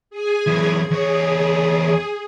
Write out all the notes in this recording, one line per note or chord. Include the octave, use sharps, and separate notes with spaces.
G#4 G#5
F#2 E3
E2 G#4 C#5